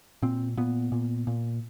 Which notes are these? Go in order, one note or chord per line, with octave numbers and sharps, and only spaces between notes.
A#2 C4
A#2 B3
A#2
A#2